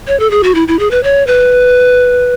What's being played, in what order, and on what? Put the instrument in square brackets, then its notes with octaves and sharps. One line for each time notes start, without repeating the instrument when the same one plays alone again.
[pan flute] C#5
A4
G#4
F#4
E4
E4
G#4
B4
C#5
B4